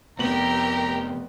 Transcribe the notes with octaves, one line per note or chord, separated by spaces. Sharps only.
F1 F2 C3 B3 G4 A#4 A#5 F#7